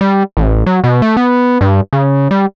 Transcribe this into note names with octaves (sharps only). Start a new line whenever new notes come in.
G3
A1
F#3
B2
A3
B3
G2
C#3
G3